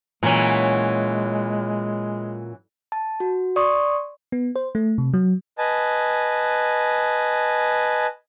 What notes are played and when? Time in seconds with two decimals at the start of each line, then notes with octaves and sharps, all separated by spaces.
0.23 A#2 E3 F#3 G#3 C#4
2.92 A5
3.20 F#4
3.56 D5 C6 C#6 D#6
4.32 B3
4.56 C5
4.75 A3
4.98 C3
5.14 F#3
5.58 B4 D#5 G#5 A5